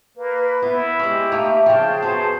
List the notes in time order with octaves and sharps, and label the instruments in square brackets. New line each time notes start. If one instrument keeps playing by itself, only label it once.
[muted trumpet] A#3 [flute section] B4
[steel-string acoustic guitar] B3 [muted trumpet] E4
[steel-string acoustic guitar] G#3 C#4 [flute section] G4
[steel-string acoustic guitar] A3 A#3 D#4
[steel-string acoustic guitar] C#3 F3 [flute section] G#4 A5 [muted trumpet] G5
[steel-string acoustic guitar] F#2 B3 C#4 [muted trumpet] C5